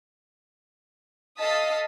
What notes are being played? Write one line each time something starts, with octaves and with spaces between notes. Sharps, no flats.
A4 D#5 F5 A5 D#6 B6